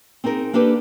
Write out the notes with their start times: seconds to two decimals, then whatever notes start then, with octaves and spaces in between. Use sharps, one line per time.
0.24 C4 D#4 G#4 A#4
0.53 A#3 D4 G4 A4 B4